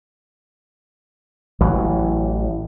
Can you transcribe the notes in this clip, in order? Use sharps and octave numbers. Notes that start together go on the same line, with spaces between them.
A1 E3 F#3